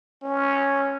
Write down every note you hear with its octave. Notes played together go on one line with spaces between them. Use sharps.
C#4